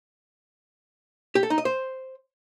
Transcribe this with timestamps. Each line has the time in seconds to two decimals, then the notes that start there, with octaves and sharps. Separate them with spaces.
1.35 G4
1.43 A4
1.50 D#4
1.58 D#5
1.65 C5